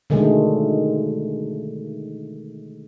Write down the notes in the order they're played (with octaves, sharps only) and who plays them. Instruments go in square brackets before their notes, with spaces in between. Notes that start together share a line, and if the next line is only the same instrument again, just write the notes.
[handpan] B2 D3 D#3 G#3 A3